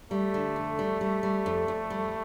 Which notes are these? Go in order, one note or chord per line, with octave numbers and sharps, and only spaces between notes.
G3 A3
D3
F2
G3
G3
G3
F2
F2
G3